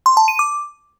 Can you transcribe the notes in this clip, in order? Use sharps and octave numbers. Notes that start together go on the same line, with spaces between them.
C6
A5
D#7
D6